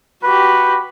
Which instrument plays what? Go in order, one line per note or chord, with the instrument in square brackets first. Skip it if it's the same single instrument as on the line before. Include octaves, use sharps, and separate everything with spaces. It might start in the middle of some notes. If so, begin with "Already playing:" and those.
[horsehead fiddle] F#4 G4 [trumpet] B4